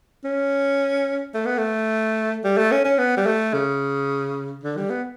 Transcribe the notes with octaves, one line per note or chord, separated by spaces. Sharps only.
C#4
A3
B3
A3
G3
A3
C#4
C#4
B3
G3
A3
C#3
D3
G3
B3